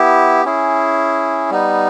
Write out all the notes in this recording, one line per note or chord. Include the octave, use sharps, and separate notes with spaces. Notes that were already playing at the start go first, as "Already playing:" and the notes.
Already playing: B3 E4 G4
C#4 E4 G#4
G3 B3 D#4